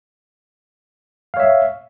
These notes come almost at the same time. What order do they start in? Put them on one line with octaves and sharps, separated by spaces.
F5 C#5 E5